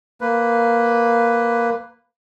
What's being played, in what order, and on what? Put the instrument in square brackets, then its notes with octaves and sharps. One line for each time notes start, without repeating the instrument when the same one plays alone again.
[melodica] A#3 B4